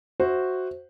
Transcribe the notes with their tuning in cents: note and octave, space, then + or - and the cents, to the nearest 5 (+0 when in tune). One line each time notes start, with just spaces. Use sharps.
F#4 +0 C5 +0 E5 -15